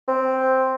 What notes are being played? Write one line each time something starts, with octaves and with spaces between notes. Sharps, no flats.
C4